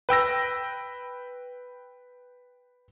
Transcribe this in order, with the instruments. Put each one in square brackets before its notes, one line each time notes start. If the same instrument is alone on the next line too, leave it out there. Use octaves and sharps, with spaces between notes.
[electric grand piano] B4 G5 E6 A#6